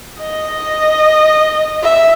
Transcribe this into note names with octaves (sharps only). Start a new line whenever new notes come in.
D#5
E5